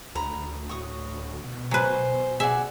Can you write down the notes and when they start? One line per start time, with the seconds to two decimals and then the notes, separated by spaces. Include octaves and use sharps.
0.15 D2 A#5 B5
0.69 A2 F#4 C#6 D#6
1.44 B2
1.71 F#3 B4 C5 G#5
2.40 G#4 D5 E5 F#5